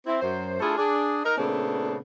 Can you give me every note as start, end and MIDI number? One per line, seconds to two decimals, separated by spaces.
0.06 0.19 60
0.06 0.19 64
0.21 0.59 42
0.21 0.59 72
0.60 0.74 57
0.60 0.74 62
0.60 0.74 64
0.60 0.74 65
0.60 0.74 68
0.60 0.74 69
0.77 1.20 62
0.77 1.20 68
1.25 1.36 63
1.25 1.36 70
1.38 1.97 46
1.38 1.97 49
1.38 1.97 57
1.38 1.97 59
1.38 1.97 60
1.38 1.97 62